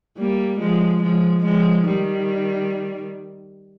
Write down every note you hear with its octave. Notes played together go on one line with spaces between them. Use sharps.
G3 A#3
F3 G#3
F3 G#3
F3 G#3
D#3 G3